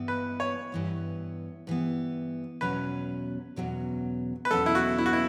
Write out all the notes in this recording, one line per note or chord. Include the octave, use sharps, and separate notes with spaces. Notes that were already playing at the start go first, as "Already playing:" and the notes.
Already playing: G2 E3 B3
B4
C#5
G2 E3 B3
G2 E3 B3
E2 B2 F#3 C#4 B4
E2 B2 F#3 C#4
B4
E2 B2 F#3 C#4 A4
E4
F#4
E4
F#4
E4